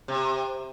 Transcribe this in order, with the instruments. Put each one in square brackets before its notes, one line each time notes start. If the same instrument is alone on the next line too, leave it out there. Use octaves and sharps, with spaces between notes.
[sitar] C3